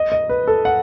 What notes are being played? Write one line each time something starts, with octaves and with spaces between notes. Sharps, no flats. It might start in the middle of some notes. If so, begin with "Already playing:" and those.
Already playing: D#5
D#5
B4
A4
F#5